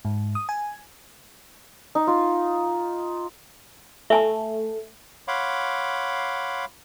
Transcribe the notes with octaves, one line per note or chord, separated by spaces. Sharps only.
G#2
D#6
G#5
D#4
F4
A3 E5 G#5 A5
C#5 F5 F#5 B5 C6 D6